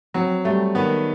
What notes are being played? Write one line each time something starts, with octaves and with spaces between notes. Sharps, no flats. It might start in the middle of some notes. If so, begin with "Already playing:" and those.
F#3 C4
G3 A3
D#3 B3